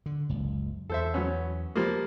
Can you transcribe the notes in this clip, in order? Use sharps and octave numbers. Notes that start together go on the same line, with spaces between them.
D3
F#1 C#2
E2 A4 C5 E5
F#3 B3 C#4
F3 G3 A#3